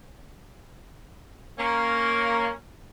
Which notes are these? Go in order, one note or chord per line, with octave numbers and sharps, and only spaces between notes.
A#3 C#4